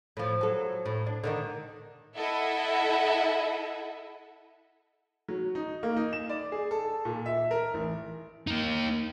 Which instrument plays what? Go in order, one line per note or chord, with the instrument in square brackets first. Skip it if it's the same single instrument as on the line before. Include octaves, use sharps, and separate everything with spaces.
[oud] A2 F3
F#3 A4
A2
D4
D3 D#3 D#4
[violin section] E4 A4 D#5 E5 F#5
[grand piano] F#3
D#4
A#3
D#4
E7
D5
G#4
A4
A#2
E5
A#4
A1
[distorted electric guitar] A#3 D#4